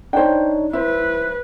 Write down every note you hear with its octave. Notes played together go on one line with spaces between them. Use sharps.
D4 D#4 C5 C#5 G5
E4 B4 C5 E5